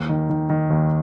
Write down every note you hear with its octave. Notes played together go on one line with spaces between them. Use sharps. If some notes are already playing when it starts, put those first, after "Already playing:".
Already playing: D#2
D#3
D#3
D#3
D#2